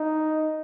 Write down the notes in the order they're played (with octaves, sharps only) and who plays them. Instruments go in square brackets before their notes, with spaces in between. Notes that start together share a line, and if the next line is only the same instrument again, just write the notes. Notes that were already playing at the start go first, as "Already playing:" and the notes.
Already playing: [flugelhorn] D#4